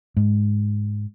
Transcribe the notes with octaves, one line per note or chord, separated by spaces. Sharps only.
G#2